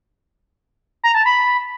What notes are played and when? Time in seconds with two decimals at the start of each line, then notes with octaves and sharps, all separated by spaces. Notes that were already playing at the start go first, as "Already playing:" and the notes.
1.04 A#5
1.15 A5
1.26 B5